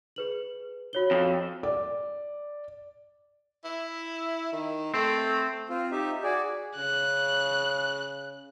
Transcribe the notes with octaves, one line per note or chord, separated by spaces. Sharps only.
G#4 B4 F#7
F#4 C#5 G7
F2
D5
E4
D#3
A3 C4
C4 F4
D#4 G4 E5
F#4 G#4 D5
C#3 F#6